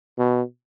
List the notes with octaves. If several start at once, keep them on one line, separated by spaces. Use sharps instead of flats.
B2